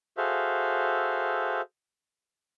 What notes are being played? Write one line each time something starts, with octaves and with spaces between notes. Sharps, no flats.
F#4 G#4 A4 C5 E5 F5